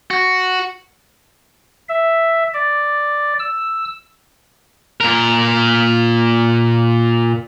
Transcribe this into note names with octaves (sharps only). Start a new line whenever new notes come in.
F#4
E5
D5
E6
A#2 A#4